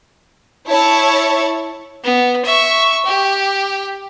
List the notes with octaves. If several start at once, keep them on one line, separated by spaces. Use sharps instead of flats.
E4 C#5 A5
B3
E5 C#6
G4